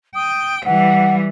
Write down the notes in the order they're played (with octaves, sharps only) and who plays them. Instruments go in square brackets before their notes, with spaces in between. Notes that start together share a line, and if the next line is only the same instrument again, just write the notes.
[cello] G5 [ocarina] D#6
[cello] E3 G3 [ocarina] F#5